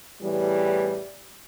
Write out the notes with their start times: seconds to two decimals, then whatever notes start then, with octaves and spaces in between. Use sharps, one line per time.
0.21 E2 A2 E3 G3